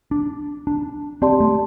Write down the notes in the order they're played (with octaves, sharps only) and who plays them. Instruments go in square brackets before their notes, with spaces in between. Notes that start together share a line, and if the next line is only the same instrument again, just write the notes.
[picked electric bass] D4
D4
[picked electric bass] C4 [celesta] G4 D5 A5 C6
[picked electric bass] A3